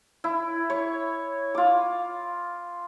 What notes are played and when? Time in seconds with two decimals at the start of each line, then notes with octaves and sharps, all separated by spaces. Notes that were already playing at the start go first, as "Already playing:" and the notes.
0.24 E4
0.70 C#5
1.55 F4 D6